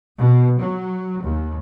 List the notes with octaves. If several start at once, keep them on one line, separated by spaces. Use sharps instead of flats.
B2
F#3
D#2